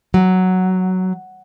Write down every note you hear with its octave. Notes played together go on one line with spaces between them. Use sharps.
F#3